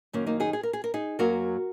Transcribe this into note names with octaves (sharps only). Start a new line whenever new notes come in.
F#2 D#3 A#3 C#4
A#3 D#4
D#4 G#4
G#4
A#4
G#4
A#4
D#4 G#4
F#2 F#3 A#3 F#4 A#4